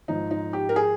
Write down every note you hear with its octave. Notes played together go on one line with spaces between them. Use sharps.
G#2 F3 D#4
D#4
G4
A#4
G#4